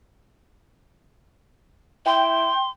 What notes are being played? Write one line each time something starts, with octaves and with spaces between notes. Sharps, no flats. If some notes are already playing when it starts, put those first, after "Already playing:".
E4 G5 C6